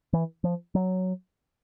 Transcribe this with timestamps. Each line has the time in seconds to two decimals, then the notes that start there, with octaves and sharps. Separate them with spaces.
0.13 E3
0.44 F3
0.75 F#3